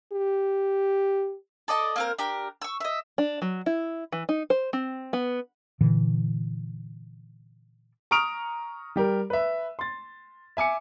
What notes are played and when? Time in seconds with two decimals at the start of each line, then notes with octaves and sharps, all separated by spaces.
0.13 G4
1.68 A4 D5 D#5 A5
1.96 A#3 C4 A#4
2.18 D4 G4 A#4
2.62 C#6 E6
2.80 D#5 E5
3.18 D4
3.42 F#3
3.66 E4
4.12 E3
4.29 D#4
4.50 C5
4.73 C4
5.13 B3
5.81 A#2 D3 E3
8.11 A#5 C#6 D#6 F6 D7 F7
8.96 G3 G4 A#4
9.30 B4 E5
9.79 C6 A6
10.57 E5 G#5 D6 C#7